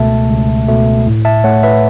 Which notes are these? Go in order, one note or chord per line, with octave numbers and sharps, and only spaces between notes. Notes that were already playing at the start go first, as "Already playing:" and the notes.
Already playing: C#2 B2 A3 E5 A5
C#2
B2 A3
A2
E5 A5
A3 C#5 F#5
B4 E5